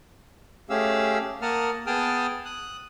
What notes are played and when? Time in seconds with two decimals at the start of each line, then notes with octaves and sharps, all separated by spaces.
0.70 A3 C#4 G4 G#4 F5 E6
1.42 A#3 A#4 F#5 A5 D#6 F6
1.87 B3 G#4 G5 A5 D#6 F6
2.45 D#6 F#6